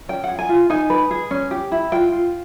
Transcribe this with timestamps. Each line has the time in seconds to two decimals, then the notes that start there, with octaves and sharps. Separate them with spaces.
0.09 C#4 G5
0.24 G#4 F#5
0.39 G#5
0.49 F4
0.70 D#4 G#5
0.90 B4
1.11 G#4
1.31 C#4
1.51 G4
1.72 E4
1.92 F4 G5
2.12 F4